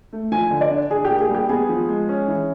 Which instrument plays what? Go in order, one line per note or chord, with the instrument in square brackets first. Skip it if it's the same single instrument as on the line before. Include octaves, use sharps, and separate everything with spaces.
[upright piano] A3
[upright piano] F3 [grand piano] G#5
[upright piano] D3
[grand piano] D5
[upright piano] D4
[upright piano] D4 [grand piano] G#4
[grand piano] G4
[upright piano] A#3
[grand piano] G#4
[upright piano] G3
[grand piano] G4
[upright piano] B3 [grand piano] G#4
[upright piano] F3
G#3
C#4
E3